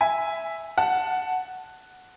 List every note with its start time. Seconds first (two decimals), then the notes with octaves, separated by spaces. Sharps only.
0.01 E5 G#5
0.78 F#5 A5